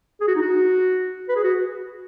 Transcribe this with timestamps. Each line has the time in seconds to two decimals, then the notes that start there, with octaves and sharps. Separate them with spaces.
0.21 G#4
0.28 F#4
0.35 D#4
0.42 F#4
1.29 B4
1.36 G#4
1.44 F#4